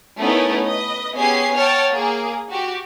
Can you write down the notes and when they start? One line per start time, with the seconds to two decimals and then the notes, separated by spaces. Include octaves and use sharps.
0.19 A3 B3 C#4 D#4 E4 A#4
0.62 B4 D#5
1.15 B3 C#4 G4 G#4 G#5 C7
1.56 C#5 F#5 G5 A5 F6
1.92 A#3 G#4
2.50 F#4 G4